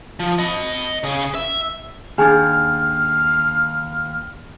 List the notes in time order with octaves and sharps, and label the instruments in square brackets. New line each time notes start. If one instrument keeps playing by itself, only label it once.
[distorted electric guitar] F3
D#5 B5
C#3 G#4
E5
[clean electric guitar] D#2 [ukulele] D4 G#4 [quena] F6